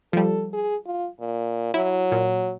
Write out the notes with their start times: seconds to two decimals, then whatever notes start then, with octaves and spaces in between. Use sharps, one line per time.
0.13 F3 G3 A4
0.53 G#4
0.86 F4
1.20 A#2
1.74 F#3 E4
2.12 A#2